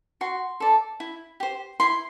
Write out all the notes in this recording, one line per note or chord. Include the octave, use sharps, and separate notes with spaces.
F#4 C6
A4 D5
E4
G4 C5
E4 C6